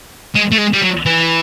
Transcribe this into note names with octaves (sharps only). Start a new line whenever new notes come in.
G#3
A3
G#3
G3
F#3
E3